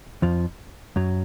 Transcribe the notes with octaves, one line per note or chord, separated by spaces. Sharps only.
F2 F3
F#2 F#3